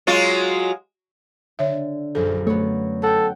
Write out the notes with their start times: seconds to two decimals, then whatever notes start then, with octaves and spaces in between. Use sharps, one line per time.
0.07 F#3 G#3 F4
1.59 D3 C#5 E5
2.15 A#1 F#2 A4
2.47 A3 B3 C#5
3.03 A4 F#5 G5